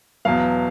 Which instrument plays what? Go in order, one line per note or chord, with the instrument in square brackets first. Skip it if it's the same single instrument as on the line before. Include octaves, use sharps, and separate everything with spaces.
[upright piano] E2 B2 F#3 B3 F5